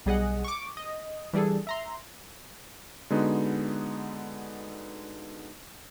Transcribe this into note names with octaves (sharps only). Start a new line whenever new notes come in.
B1 G3 G#4 D#5 F#5
C#6 D6
D#5
E3 G3 D4 G#4 A4
E5 A#5 C6
D3 G#3 B3 D#4 F#4